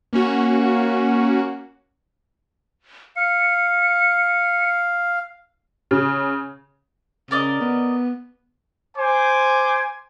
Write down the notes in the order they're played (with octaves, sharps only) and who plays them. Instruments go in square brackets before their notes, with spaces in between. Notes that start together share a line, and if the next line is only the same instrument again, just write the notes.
[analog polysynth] A#3 C#4 F#4
[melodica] F5 [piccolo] C#7
[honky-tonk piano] C#3
[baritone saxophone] C#3 [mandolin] A#4 D5 D#5
[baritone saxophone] B3
[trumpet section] C5 G#5 D6